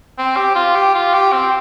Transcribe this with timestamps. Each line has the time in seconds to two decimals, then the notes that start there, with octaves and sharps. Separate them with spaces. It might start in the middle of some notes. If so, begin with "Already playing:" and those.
0.18 C4
0.36 G4
0.55 F4
0.75 G4
0.94 F4
1.13 G4
1.32 C4